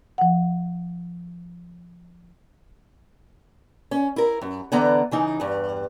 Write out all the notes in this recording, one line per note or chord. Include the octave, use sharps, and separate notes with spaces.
F3 F#5
C#4
E4 A#4
F#2
D3 E3 B3 D5 A#5
C#3 E3 D#4
E2 G2